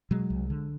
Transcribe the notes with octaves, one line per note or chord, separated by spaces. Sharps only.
B2 F#3 G#3
C2
D3